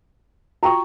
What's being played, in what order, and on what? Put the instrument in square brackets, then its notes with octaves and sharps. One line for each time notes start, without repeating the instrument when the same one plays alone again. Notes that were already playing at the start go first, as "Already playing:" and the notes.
[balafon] F4 F#4 G5 [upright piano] A#5 C#6